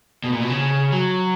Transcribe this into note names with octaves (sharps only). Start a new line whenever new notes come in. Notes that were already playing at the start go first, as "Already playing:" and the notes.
B2
A#2
B2
C#3
F#3